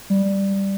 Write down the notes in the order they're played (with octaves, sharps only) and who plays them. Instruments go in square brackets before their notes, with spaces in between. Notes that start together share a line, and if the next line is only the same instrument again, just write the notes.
[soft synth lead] G3